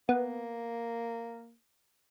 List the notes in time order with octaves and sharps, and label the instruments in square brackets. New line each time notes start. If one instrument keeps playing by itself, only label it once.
[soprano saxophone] A#3 [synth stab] B3